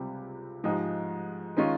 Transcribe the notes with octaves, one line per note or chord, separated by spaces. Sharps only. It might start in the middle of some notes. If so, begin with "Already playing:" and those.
Already playing: C#2 C3 G3 C4 G4
G#2 F3 G#3 D#4 G4
D#3 G#3 C#4 F4